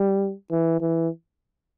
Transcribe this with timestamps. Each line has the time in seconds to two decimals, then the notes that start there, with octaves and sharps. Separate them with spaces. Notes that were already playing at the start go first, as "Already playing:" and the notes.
Already playing: G3
0.51 E3
0.81 E3